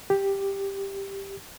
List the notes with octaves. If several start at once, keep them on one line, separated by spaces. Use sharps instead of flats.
G4